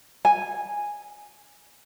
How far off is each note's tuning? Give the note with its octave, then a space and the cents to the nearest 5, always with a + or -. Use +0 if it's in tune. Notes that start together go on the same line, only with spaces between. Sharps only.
G#5 -5